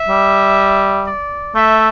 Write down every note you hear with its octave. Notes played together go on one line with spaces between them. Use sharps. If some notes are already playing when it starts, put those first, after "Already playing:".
Already playing: E5
G3
D5
A3 E5